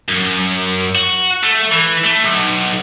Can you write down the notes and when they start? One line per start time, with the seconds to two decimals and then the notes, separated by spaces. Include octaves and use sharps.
0.08 F#2
0.95 F#4
1.43 A3
1.72 E3
2.04 A3
2.25 B1